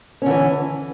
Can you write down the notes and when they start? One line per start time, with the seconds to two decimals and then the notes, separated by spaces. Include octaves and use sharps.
0.22 C#4
0.26 D3
0.30 E3